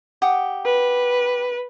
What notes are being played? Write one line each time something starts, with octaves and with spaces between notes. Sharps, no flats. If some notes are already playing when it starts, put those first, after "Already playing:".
G4 F#5 D#6
B4